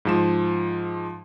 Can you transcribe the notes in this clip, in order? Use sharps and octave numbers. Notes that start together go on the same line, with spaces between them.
G#2 F3 E7